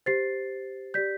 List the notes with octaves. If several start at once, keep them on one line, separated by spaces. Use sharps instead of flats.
G4 C5 A6 C7
G4 D5 G6 B6